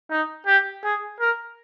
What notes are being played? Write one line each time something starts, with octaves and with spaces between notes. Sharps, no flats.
D#4
G4
G#4
A#4